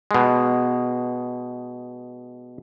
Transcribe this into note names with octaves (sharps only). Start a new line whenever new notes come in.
B2 G#3